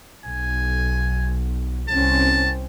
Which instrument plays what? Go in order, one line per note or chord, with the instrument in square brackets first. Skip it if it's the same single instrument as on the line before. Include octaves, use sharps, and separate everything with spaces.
[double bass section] B1 [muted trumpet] G#5
[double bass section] C2 C4 C#4 [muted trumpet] A5